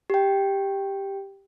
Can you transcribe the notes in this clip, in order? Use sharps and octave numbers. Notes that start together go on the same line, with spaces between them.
G4 G5